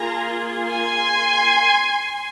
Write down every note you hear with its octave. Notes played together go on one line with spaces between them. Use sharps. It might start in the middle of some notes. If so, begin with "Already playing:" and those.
Already playing: A#3 F4 G#4 A#5
G#5 C6